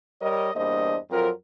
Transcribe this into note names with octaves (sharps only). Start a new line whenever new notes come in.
G3 A#4 C#5 D#5
E2 G2 A#3 D4 C5 D#5
F2 F#3 C4 F4 A#4